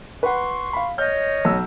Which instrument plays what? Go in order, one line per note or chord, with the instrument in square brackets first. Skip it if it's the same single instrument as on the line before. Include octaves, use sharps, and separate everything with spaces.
[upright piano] B4 F#5 [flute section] C6 C#6
[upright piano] F5 B5
[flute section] C#5 D#5 [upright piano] F6 G6
[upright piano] B1 E6